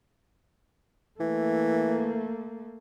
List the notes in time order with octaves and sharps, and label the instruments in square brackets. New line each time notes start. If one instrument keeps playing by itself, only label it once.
[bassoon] E3 [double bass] A3 A#3